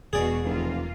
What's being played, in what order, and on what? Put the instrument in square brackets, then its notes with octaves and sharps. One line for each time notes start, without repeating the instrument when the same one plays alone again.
[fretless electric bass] E1 [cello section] B2 F#4 [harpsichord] G#4 D5
[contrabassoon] F1 [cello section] E3 A#3 F4